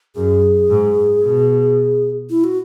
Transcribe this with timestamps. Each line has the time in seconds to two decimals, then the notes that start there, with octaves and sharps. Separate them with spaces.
0.16 F#2 G#4
0.70 G#2
1.23 B2
2.30 E4
2.44 F#4